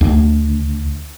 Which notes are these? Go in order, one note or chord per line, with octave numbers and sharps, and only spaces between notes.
D2